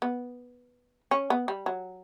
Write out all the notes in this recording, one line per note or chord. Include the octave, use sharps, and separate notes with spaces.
B3
C#4
B3
G3
F#3